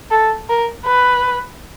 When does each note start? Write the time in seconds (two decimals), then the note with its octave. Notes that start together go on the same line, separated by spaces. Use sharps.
0.11 A4
0.49 A#4
0.86 B4